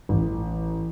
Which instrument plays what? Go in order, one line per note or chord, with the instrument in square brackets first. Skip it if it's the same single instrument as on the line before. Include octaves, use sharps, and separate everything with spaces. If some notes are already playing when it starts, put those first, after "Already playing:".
[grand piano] A1